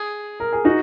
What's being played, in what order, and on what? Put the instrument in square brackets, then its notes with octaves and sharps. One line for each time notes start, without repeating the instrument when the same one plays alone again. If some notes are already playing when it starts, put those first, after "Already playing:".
Already playing: [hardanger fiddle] G#4
[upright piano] A#4
G#4
D#4 F#4